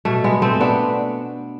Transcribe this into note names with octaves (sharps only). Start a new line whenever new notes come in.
B2 A3
G#3 B3
A3 C4
B3 D4